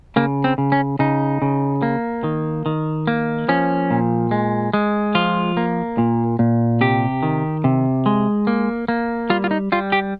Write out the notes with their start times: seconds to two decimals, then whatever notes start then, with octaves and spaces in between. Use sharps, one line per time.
0.16 C#3 A#3
0.44 C4
0.58 C#3
0.72 C#4
0.99 C#3 D#4
1.42 C#3
1.82 A#3
2.24 D#3
2.66 D#3
3.07 A#3
3.49 F3 C#4
3.90 A#2
4.31 G#3
4.73 G#3
5.15 F3 F4
5.57 A#3
5.98 A#2
6.39 A#2
6.81 C3 G4
7.23 D#3
7.64 C3
8.06 G#3
8.47 A#3
8.88 A#3
9.30 G3 F4
9.44 F4
9.51 D#4
9.72 G3 F4
9.92 G4